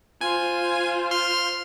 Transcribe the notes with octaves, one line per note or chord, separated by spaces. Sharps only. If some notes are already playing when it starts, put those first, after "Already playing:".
F4 C5 G#5
C6 F6